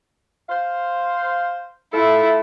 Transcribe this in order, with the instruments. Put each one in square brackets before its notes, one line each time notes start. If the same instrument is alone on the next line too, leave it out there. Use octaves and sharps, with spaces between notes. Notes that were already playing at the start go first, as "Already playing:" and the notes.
[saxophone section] C5 F5
[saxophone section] A3 F4 A4 [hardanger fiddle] E4